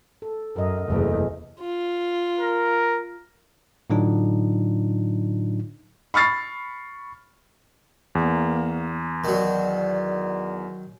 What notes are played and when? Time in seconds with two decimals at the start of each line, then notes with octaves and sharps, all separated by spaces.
0.22 A4
0.56 F#2 A#4 D#5
0.88 F#1 E2 C3 G#3 A3
1.60 F4
2.40 A#4
3.90 A2 D3 F#3 D4 D#4 F4
6.14 B5 C#6 F6 A6 C7
8.15 E2 A#3
9.24 D#3 F#3 D5